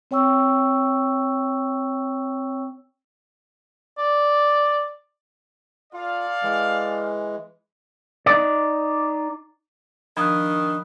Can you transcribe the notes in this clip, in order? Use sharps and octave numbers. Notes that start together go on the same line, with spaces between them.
C4 C#5 G5 C#6 E6
D5
F4 A4 D5 F5
E3 G#3
D#4 D5
D#3 F3 D4 B5 D#6 F#6